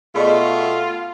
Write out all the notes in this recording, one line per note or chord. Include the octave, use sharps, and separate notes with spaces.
B2 A3 F4 G#4 D5 D#5